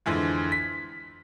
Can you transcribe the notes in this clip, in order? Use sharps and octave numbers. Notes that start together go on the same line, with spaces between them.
F2 D3 E3 G#3
B6